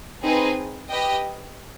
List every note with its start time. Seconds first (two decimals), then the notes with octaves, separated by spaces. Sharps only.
0.24 C4 D#4 G#4 B4
0.89 G4 B4 D#5 G5